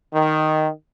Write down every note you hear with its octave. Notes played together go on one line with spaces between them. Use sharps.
D#3